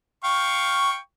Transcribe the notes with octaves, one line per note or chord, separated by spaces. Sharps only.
F5 G5 C#6